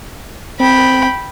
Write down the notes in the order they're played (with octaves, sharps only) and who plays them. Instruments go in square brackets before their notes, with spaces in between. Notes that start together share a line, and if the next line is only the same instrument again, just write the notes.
[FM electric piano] C4 [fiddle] G5 B5